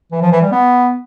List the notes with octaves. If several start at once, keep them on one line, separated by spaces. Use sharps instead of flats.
E3
F3
E3
G3
B3